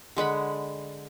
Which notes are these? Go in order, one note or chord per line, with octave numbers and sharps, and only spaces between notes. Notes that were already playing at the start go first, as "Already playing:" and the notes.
D3 G#3 F#5 B5